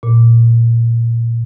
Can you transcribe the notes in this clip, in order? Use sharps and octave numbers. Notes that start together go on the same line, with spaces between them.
A#2